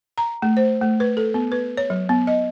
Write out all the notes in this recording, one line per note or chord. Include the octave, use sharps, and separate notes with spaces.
A#5
A3
C5
A3
B4
A4
B3
B4
C#5
F#3
B3
D#5